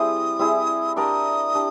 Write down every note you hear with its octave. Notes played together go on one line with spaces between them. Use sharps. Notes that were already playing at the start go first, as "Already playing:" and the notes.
Already playing: G3 C4 E4 G#4 D#6
G3 C4 E4 G#4
D4 G4 A#4 D5 D#6
D4 G4